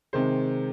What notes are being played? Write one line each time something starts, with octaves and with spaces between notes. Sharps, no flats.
C3 D#3 G#3 C5